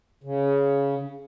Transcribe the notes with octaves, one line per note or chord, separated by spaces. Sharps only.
C#3